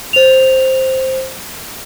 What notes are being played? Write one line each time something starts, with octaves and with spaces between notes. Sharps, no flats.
C5 F7